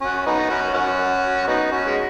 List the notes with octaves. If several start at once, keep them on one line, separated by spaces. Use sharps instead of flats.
C#4 F#4
B3 D#4
C#4 F#4
C#4 F#4
B3 D#4
C#4 F#4
G#3